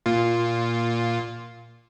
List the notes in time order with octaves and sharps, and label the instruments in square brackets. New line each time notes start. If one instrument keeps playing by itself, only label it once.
[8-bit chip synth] A#2 F4